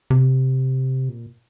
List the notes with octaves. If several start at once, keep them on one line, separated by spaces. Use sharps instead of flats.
C3
A#2